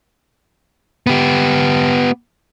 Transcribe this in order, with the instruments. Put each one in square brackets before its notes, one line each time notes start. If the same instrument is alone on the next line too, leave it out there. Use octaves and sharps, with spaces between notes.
[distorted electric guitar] B3 G4